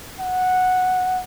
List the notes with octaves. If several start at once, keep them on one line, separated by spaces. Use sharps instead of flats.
F#5